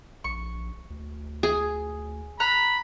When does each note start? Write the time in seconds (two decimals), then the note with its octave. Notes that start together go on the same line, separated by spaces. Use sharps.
0.24 A#1 C#6
0.90 D2
1.43 G#4
2.40 A#5 B5 F#6